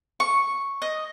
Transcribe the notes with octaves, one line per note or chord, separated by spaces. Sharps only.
C#6
D#5